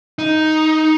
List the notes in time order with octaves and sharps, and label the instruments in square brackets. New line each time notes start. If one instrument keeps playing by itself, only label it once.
[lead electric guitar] D#4